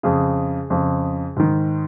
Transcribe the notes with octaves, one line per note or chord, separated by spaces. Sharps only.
F2 C#3 G#4
F2 C#3
G#2 D#3